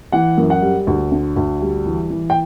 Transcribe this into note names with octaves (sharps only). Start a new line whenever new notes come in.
E3 F#5
F#2
F#5
G3
D2
D3
D2
G3
E3
E3
G5